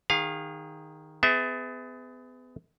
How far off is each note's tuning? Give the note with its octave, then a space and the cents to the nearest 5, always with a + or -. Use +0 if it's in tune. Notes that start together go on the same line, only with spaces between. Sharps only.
D#3 +0 G#4 -30 F5 +10
B3 +35 G#4 +0 E5 -15